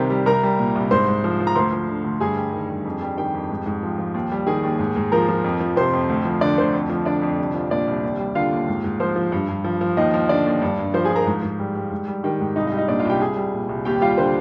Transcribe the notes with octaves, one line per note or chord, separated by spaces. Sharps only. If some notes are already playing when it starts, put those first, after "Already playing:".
Already playing: C2 C3 D#3 G3 A#4 C5
G3
C2 A#4 A#5
G3
A#2
C2
G#2 C5 C6
G#2
F3
F3
A#5
D2 C5 C6
F3
D3
D2
G2 G#4 G#5
G3
D#3
G2
F2
G3
D#3 G4 G5
F2
G#2
G#2
F3
F3
D#2
G3
D#3 G#4 G#5
D#2
G#2
G#2
F3 A#4 A#5
F3
F2
F3
C3 C5 C6
F2
D2
F3
D3 D4 D5
D2 C5
F2
F3
D3 D4 D5
F2
C2
F3
A#2 D4 D5
C2
D#2
G3
D3 F4 F5
D#2
G#2
G#2
F3 C5
F3
G2
G2
F3
F3
D#2 D#4 D#5
F3
D3 D4 D5
D#2
G2
G2
F3 C5
G#4 G#5
F3
A#4 A#5
G#2
G#2
G3
G3
G#2
G3
D#3 G4 G5
G#2
C2 D#4 D#5
D#4 D#5
G3
D#4 D#5
A#2 D4 D5
F4 F5
C2 G4 G5
C2 G#4 G#5
G3
A#2
C2
D#2 G4 G5
G3 F4 F5
D3 C5